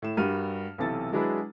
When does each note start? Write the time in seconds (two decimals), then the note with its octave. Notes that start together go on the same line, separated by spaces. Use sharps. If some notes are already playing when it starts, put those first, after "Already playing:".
0.02 A2 E7
0.17 G2 G3 F#4 A#4 F6 D#7
0.78 B1 C3 E3 A4 A6
1.12 F#3 G#3 D4 E4 G#4 B4